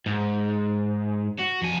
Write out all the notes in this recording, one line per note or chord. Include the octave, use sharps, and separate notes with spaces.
G#2
F#4
F2 G#5